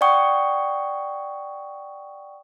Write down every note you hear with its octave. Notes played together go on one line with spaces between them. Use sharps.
D5 F#5 G5 C#6 D#6